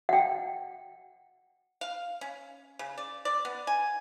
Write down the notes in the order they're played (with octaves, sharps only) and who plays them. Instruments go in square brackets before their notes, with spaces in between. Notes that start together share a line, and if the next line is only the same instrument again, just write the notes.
[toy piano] F#5 G5
[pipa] F5
C#4
C#3
D5
D5
B3
G#5